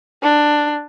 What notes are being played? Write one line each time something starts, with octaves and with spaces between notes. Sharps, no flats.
D4